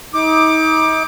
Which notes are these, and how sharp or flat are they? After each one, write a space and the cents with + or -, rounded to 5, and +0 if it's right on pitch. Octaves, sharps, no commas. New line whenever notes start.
D#4 +35 D6 +20